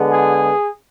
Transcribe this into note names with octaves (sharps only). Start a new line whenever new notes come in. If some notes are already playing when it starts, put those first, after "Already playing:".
Already playing: D3 G#3 B3
G#4